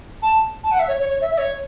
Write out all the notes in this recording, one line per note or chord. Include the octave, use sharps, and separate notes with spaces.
A5
A5
F#5
E5
C#5
C#5
C#5
E5
E5
C#5